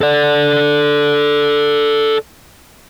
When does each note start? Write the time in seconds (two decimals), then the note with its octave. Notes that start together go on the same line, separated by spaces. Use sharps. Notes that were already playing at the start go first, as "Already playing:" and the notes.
0.01 A4 D5